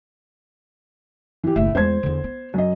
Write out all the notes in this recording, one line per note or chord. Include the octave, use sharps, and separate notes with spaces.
E3 G4
F#1 A2 E5
E2 G#3 C5 G#6
E2 D3
B3
F#2 D#5